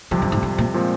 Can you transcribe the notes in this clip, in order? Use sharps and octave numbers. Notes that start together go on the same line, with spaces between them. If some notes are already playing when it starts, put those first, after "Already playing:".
F2 C3 F3 G3
G2
G#2
G#2
A#2
A#2 F3 G#3 C4